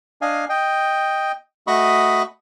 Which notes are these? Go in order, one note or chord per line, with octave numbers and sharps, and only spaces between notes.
D4 D#5 F5 G#5
D#5 G5
A3 F#4 D#5 B5 C#6 D#6